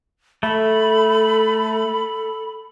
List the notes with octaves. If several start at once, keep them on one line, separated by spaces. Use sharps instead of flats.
A3 A4 B5